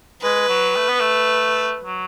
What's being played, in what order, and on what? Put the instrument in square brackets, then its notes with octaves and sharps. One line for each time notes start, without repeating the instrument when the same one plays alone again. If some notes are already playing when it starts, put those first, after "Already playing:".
[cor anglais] G#3 [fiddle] B4
[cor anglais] F#3
A3
B3
A3
F#3